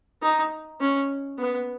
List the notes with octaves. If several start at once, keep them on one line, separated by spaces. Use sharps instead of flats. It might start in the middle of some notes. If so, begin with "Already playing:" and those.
D#4
C#4
B3